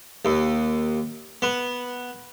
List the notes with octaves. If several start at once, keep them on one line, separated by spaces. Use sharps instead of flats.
D#2
B3